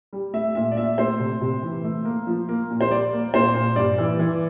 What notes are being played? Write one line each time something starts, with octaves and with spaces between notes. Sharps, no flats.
G3
A3 E5
A#2 E5
D5
A#2 E5
A3 C5
C3
C3
E3
A3
A#3
F3
A#3
A#2
C5
G3 D5
A#3
A#2 C5
A#2
G2 D5
E3
E3